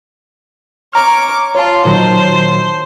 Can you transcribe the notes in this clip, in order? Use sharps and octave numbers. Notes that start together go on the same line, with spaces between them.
C#5 A#5 D6 F6
F4 C#5 A5
A#2 D#3 F#3 C5